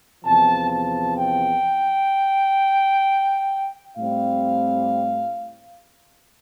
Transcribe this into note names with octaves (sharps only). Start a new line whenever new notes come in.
E2 C3 F3 A5
A5
G5
A2 G3 C4 F5